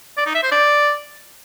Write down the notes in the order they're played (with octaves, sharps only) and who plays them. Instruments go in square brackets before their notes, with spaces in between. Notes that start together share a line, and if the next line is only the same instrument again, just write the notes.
[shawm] D5
D#4
E5
C5
D5